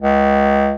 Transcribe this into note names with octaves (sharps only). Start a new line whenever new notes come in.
C#2